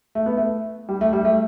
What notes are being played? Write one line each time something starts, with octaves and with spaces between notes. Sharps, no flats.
A3
B3
A3
G3
A3
G3
A3